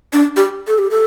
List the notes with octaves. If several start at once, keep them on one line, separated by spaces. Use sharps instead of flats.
D4
G4
A4
G4
A4